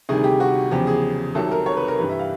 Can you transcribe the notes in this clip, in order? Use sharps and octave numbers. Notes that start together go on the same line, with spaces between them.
D2 C3 D#3 G3 G#4
G4
F#4
E2 C#3 F3 G4
G#4
C2 C3 D#3 F#3 A4
A#4
C#5
B4
A#4
G2 E3 G3 B4
E5
F5